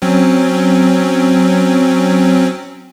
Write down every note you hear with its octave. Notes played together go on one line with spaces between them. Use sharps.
F#3 C4 C#4